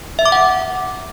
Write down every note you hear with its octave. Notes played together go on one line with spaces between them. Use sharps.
E5
D6
F#5